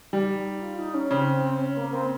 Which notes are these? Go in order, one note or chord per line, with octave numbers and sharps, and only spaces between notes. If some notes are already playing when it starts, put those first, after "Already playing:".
G3 D#4
F4
D#4
C#4
C#3 C4
C#4
A#3
C4